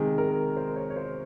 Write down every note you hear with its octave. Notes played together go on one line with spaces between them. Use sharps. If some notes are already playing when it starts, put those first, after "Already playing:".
Already playing: C3 D#3 G#3 G#4
A#4
C5
C#5
C#5
C5